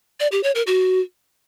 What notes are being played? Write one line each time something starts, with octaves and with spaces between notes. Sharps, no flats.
D5
G4
C#5
A#4
F#4